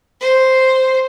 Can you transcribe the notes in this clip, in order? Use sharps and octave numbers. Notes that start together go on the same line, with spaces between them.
C5